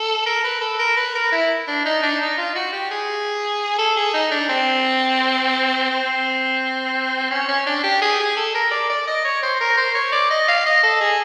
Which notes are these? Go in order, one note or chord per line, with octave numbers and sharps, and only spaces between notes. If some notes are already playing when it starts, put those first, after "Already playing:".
Already playing: A4
A#4
B4
A4
A#4
B4
A#4
E4
D4
D#4
D4
D#4
F4
F#4
G4
G#4
A4
G#4
D#4
D4
C4
C4
C#4
C#4
D4
G4
G#4
G#4
A4
A#4
D5
D5
D#5
C#5
C5
A#4
C5
C#5
D5
D#5
F5
D#5
A4
G#4